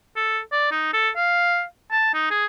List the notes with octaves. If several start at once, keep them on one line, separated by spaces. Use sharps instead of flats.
A4
D5
D#4
A4
F5
A5
D#4
G#4